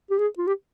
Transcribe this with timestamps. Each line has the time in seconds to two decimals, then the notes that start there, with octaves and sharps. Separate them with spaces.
0.10 G4
0.18 G#4
0.38 F4
0.47 G4